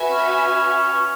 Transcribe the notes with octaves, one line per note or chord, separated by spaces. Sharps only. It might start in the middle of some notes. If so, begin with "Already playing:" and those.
Already playing: F#4 B4 E5 G#5
C#4